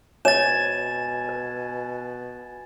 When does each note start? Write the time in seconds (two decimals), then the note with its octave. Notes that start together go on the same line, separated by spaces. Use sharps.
0.25 B2 C#5 G#5 A6 E7
1.29 B4